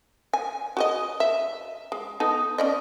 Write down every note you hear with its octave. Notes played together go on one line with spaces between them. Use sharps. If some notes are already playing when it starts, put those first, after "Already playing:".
G#5
F#4 G#4 D#5
E5
G#3
B3 D#4 A4
C#4 D5 D#5